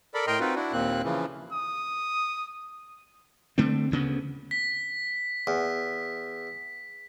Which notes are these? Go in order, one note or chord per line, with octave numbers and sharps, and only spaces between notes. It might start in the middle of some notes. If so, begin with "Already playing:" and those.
A4 A#4 D5 B5
A2 A#4 D#5 G5 A#5 C6
C4 D#4 F4 F#4 B4
D4 E4 F#4
D#2 A#2 A#3 C4 F#6
C#3 E3 F3
D#6
D3 A3 C4
D2 C#3 B3
B6
E2